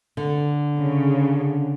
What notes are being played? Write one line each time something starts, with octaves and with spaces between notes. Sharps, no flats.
D3
C#3